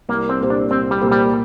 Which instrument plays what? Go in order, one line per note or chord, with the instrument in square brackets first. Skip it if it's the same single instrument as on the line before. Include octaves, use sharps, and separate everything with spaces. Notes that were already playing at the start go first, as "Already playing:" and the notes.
[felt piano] C2 [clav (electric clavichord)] A#3
[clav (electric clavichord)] C4
[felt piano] A#2 A#3 G4 C5
[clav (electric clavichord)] D4
[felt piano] C2 [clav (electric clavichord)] C4
[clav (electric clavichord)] G3
[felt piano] A#2 A#3 G4 C5
[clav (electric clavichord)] G3